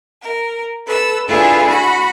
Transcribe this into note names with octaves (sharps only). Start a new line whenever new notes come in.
A#4
A4 B4 E6
D4 E4 F4 G#4 A4 B4
F#4 B5